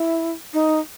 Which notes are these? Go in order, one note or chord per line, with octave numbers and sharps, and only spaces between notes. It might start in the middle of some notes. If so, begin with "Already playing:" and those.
Already playing: E4
D#4